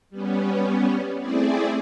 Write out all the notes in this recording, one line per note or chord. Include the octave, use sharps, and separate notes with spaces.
G3 B3 C#4
A3 C4 E4 G#4 D5